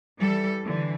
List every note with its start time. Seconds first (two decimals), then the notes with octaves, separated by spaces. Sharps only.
0.20 E3 G3 A4
0.64 D3 E3